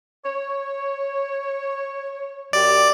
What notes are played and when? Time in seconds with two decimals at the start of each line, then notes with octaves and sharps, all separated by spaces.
0.24 C#5
2.53 F#2 G4 D5